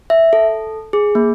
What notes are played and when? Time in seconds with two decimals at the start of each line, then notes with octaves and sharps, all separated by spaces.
0.10 E5
0.33 A4
0.93 G#4
1.15 A#3